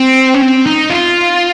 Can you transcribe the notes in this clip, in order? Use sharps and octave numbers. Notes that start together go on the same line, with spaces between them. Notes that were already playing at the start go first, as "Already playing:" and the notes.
Already playing: C4
C#4
C4
D#4
F4